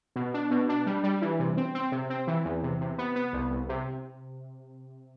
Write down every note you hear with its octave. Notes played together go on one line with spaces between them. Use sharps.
B2
D4
B2
D4
G3
G3
E3
C3
C4
C4
C3
C4
E3
E2
C3
C3
B3
B3
C2
C2
C3